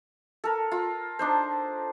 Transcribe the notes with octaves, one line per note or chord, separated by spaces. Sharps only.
A4 A#4
F4
D4 D#4 C5